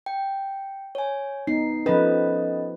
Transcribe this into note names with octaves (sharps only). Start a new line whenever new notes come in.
G5
C#5 G#5
B3 D#4 C7
F3 C#4 A4 B4 D#5